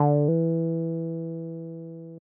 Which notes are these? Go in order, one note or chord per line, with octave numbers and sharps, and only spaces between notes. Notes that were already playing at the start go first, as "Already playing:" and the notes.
Already playing: D3
E3